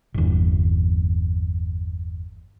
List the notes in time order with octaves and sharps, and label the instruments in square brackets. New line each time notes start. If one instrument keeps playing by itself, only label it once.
[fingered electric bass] G1 E2